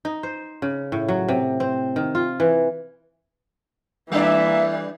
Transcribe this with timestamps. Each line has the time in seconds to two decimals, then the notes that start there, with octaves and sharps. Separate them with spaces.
0.05 D#4
0.23 C5
0.62 C#3
0.92 A2
1.09 F#3
1.28 C3
1.60 C4
1.96 D#3
2.15 F4
2.40 E3
4.12 E3 G3 A#3 D4 D5 E5